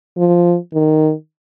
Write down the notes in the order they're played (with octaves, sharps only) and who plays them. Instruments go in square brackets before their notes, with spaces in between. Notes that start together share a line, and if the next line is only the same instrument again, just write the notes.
[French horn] F3
D#3